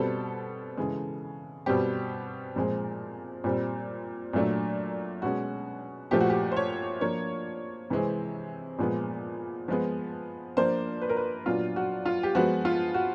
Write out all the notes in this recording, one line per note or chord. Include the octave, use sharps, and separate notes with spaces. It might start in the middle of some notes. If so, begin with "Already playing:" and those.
Already playing: B2 G3 C4 A4
C#3 E3 G#3
B2 G3 C4 G4
A#2 F3 G#3 C4
A#2 G3 C4
A#2 F#3 A3 D4
B2 G#3 C#4 F#4
A#2 F3 A3 G4
F#4
G4
C5
C#5
F3 A#3 D4 C#5
C3 E3 G#3 C4
A#2 F3 G#3 B3
F3 G#3 B3
F3 A#3 D4 C5
B4
A#4
B4
A#2 F#3 B3 D4 F4
F#4
F4
G4
F3 G#3 B3 F#4
F4
F#4